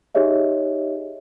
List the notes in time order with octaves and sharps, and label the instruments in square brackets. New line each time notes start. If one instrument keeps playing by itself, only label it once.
[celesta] D#4 G4 G#4 C#5 D#5 E5